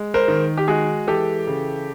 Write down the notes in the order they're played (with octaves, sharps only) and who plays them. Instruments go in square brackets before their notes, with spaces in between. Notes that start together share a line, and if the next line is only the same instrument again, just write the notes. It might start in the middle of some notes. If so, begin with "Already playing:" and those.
Already playing: [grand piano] G#3
A#4 C5
D#3
G4
G#3 F#4 G#4
E3 G4 A4
C#3